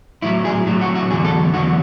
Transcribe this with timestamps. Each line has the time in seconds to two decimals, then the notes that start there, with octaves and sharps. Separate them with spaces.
0.22 A2 F#3 E4
0.45 G#4
0.66 A2 F#3
0.81 F#4
0.95 F#4
1.10 E2 D3 F#3 G#4
1.25 A4
1.53 E2 D3 F#3 F#4